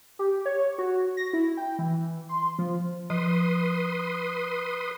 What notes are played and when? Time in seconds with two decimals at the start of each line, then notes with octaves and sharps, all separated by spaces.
0.19 G4
0.46 C#5
0.78 F#4
1.17 A#6
1.33 E4
1.57 G5
1.79 E3
2.29 C6
2.59 F3
3.10 F3 B4 C6 D#6